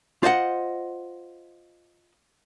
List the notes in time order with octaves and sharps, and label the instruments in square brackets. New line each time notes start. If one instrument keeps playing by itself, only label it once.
[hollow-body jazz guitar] F4 C5 D#5 F#5